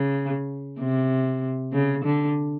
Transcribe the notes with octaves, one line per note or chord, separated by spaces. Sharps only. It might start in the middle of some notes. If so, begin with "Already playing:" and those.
Already playing: C#3
C3
C#3
D3